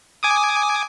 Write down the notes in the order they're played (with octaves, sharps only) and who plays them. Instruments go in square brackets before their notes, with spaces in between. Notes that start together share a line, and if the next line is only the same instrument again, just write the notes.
[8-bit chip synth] G#5 D6 D#6